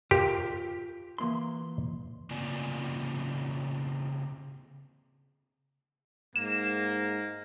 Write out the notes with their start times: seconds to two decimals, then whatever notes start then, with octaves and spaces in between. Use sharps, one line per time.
0.11 F4 G4 A#4 C5
1.18 E3 A#3 C6
2.31 C#3 A#3 C4 F4 D5 G#5
6.36 G#2 A#3 E7